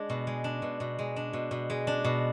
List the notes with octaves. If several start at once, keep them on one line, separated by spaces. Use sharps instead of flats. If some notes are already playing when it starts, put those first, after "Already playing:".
Already playing: G#3 D4
B2
G#3
D4
B2
B2
G#3
D4
B2
B2
G#3
D4
B2